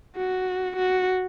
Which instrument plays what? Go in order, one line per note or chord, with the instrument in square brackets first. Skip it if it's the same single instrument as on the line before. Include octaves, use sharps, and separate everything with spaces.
[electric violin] F#4
F#4